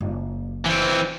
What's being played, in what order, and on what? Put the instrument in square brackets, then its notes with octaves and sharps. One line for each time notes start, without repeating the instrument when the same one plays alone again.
[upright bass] F#1
[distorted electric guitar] E3 C4